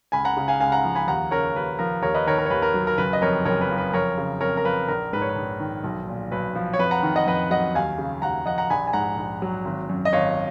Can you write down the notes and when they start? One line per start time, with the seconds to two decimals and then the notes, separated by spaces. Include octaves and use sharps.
0.12 C#2 G#5 B5
0.25 F#5 A#5
0.37 C#3
0.48 F5 G#5
0.60 C#2 F5 G#5
0.72 F#5 A#5
0.85 F3
0.95 G#5 B5
1.08 D#2 F#5 A#5
1.31 C#3 A#4 C#5
1.56 D#2 B4
1.79 F3 A#4
2.03 D#2 A#4 C#5
2.14 B4 D#5
2.27 D#3 A#4 C#5
2.39 A#4
2.46 C#5
2.50 D#2 B4
2.62 A#4
2.74 F#3
2.87 A#4
2.98 F#1 B4
3.13 D#5
3.22 F2 A#4 C#5
3.45 F#1 A#4 C#5
3.61 B4
3.70 F3
3.78 B4
3.94 F2 A#4 C#5
4.18 C#3
4.41 F2 A#4 C#5
4.57 A#4
4.65 F3 B4
4.88 A#1 A#4
5.13 G#2 B4
5.22 C#5
5.29 B4
5.36 A#1
5.60 D#3
5.84 B1
6.07 A#2
6.32 B1 B4
6.55 F3
6.73 C#5
6.79 F2 B4
6.91 F#5 A#5
7.03 D#3
7.16 D#5 F#5
7.27 F2 B4 D#5
7.50 F#3 D#5 F#5
7.75 D#2 F5 G#5
7.98 C#3
8.22 D#2 F#5 A#5
8.46 F3 D#5 F#5
8.58 F#5 A#5
8.70 A#1 G#5 B5
8.87 G#5
8.93 G#2 F#5 A#5
9.17 A#1
9.42 F#3
9.65 G#1
9.89 F#2
10.05 D#5
10.12 G#1 C#5 F5